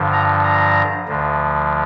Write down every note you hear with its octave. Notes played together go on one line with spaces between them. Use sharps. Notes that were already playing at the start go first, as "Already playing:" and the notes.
Already playing: G2 D3 F3
A#5
A#5
D2 D3 F3